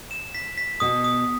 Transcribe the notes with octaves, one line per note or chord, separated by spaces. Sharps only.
E7
B6
B6
B2 D#6
D#6